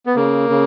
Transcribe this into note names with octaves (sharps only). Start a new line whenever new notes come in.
B3
C#3 A#3
C#3